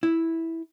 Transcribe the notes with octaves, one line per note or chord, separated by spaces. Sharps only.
E4